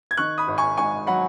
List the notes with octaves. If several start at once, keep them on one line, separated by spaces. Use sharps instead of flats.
G#6
D#3 C#6 F#6
B5 D#6
G#1
G#5 C#6
G#2 G#5 C#6
F#3 F#5 B5